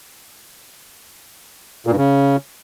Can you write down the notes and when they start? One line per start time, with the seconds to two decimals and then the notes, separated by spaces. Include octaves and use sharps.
1.87 A#2
1.92 G2
1.97 C#3